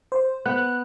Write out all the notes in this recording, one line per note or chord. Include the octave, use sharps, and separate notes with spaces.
C5
B3 F#6